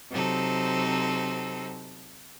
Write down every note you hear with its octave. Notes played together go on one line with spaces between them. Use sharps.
C3 F#3 C4 D#4 A4